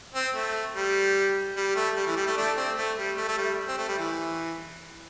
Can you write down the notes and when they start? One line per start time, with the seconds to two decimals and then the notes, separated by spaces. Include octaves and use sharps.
0.15 C4
0.35 A3
0.76 G3
1.57 G3
1.76 A3
1.96 G3
2.07 E3
2.16 G3
2.27 A3
2.37 A3 D4
2.57 C4
2.78 A3
2.98 G3
3.17 A3
3.28 A3
3.38 G3
3.68 C4
3.78 A3
3.88 G3
3.99 E3